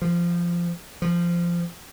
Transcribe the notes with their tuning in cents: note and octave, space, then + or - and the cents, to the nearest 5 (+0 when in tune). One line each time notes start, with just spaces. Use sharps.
F3 -15
F3 -15